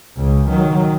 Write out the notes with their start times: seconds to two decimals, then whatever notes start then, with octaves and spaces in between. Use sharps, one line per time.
0.16 C#2 C#3
0.49 D#3 F#3